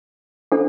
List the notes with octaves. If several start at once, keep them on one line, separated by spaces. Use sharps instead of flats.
D4 A4 C5